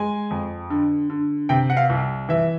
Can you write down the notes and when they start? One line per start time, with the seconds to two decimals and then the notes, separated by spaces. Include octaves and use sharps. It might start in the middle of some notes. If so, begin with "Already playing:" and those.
Already playing: G#3 G#5
0.31 F2
0.70 D3
1.10 D3
1.49 C3 G5
1.70 F#5
1.77 F5
1.90 C2
2.29 E3 E5